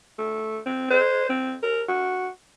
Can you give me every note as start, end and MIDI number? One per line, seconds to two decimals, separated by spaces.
0.18 0.59 57
0.65 0.86 60
0.90 1.29 72
1.29 1.55 60
1.63 1.82 70
1.88 2.29 66